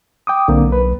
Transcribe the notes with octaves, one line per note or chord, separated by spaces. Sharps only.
G5 D6 D#6
B1 D3 A#3 C4
B4